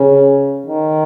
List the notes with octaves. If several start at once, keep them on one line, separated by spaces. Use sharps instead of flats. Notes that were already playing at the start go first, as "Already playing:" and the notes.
Already playing: C#3
D#3